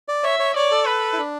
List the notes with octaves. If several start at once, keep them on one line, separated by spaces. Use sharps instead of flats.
D5
C#5 E5
C#5
C#5 D5
A4
B4
E4
D4